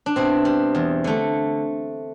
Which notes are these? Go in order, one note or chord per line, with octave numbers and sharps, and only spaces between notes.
D4
B2 C4 E4
G3
E2
D3 A3